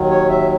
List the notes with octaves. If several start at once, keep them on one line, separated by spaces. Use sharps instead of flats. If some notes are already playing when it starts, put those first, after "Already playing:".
Already playing: D#2 D#3 F#3
C#5
E5